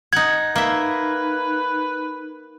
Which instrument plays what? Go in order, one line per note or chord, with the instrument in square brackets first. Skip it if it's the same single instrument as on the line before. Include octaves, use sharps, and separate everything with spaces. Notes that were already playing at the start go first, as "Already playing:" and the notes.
[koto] D#4 F#5 [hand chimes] G#6
[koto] A#3 E5 [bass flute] D#4 [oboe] B4